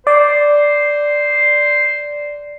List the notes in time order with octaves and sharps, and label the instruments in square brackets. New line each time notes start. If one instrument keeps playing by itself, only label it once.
[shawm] C5 [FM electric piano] D5